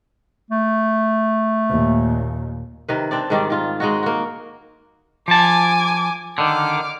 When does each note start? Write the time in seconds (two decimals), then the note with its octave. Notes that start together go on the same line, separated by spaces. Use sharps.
0.50 A3
1.70 D#2 A#2
2.89 C3 D#3 B4
3.11 C4 D4 D5
3.30 G#2 D#3 G3 D5
3.50 D#3 F4
3.80 G#3 D#4 F#4
4.03 A#3 F#4
5.28 F3 G#5 A5 D6
6.38 D3 D#3 D6 F6